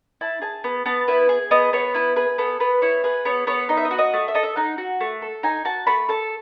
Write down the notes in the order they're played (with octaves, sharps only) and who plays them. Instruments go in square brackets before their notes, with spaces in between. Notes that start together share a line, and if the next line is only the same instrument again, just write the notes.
[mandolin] E4 A5
G#4 A5
B3
B3 A5
E4 B4
G#4
B3 D#5
B3 C#5
E4 B4
G#4 B4
B3 A4
B3 B4
E4 C#5
G#4 B4
B3 C#5
B3 C#5
D#4 D#5
E5
D#5
F#4
D#5
A3
E5
A4 D#5
E5
D#4 F#5
F#4
A3
A4
D#4 G#5
F#4 A5
A3 B5
A4 A5